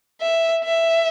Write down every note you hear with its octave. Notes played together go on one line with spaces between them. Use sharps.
E5
E5